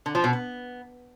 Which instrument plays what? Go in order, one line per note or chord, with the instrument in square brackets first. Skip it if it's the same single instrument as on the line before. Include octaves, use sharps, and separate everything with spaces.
[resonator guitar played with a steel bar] D3
F3
B2
B3